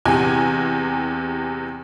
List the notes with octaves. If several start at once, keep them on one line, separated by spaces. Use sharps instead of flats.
E2 C3 G#5